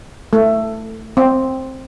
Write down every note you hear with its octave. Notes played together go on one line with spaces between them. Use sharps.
A3
C4